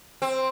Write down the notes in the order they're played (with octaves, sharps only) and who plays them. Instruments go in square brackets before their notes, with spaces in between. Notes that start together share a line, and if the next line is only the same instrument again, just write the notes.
[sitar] C4